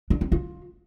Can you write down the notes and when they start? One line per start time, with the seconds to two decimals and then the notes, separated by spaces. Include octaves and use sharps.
0.10 D4
0.21 C4
0.32 F4